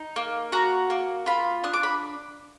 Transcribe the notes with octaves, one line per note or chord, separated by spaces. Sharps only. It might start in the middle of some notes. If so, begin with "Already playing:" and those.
Already playing: D#4
A#3
F#4 A#5
A#3
F4 B5
D4 D#6
D6
B5